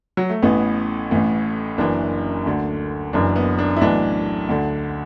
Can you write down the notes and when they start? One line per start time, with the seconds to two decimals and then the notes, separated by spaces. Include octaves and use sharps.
0.17 F#3
0.30 A3
0.42 A1 A2 E3 B3
1.11 A1 A2 E3
1.78 F#1 F#2 E3 D4
2.46 D2 D3
3.13 F#1 F#2 E3 D4
3.36 B3
3.58 D4
3.76 E4
3.81 B1 A2 E3 D4
4.49 D2 D3